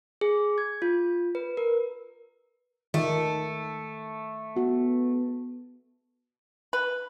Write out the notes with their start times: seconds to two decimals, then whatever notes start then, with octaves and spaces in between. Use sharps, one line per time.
0.21 G#4
0.58 G#6
0.82 F4
1.35 B4
1.57 A#4
2.94 D#3 A3
4.56 B3 F#4
6.73 B4